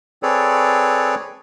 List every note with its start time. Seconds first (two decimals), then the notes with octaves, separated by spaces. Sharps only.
0.23 C4 G#4 A4 B4 C#5 D5